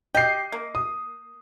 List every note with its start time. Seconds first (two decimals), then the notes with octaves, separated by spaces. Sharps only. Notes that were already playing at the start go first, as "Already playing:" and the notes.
0.15 G4 D#5 C7
0.52 A#3
0.75 D#6